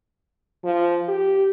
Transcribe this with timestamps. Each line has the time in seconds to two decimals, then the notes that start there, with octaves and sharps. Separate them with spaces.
0.64 F3
1.08 G4